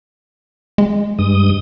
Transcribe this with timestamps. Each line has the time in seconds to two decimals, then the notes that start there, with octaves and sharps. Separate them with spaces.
0.78 G#3
1.19 G2 D#6